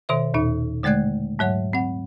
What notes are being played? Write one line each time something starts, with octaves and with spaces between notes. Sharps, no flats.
B2 D#3 C5 E5
D#2 A#2 D#4
D3 G#3 A3 D5 F#6 G#6
G#2 F#3 C#5 F#5
C4 F#5